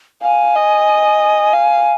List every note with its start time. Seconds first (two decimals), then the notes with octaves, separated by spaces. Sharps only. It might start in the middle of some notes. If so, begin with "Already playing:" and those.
0.22 F5 G#5
0.55 D#5
1.53 F5